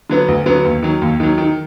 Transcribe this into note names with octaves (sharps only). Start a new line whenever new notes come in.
D3 F#3 B3
D2
D3 F#3 B3
D#2
D#3 F#3
D#2
D#3 F#3
D#3